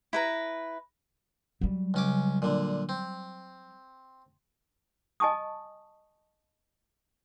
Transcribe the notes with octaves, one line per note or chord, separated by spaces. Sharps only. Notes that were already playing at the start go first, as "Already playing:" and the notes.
E4 B4 A#5
F#3 G3
C#2 C#4 D6
A#2 D3
C4
D#5 G#5 A5 C#6 D#6